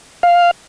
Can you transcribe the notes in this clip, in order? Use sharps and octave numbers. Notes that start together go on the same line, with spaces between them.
F5